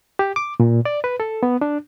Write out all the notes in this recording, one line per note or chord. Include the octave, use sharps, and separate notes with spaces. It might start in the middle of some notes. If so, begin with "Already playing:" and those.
G4
D6
A#2
D5
B4
A4
B3
D4